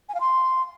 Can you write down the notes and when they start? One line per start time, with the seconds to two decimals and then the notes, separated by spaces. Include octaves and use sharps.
0.09 G#5
0.15 F5
0.20 C6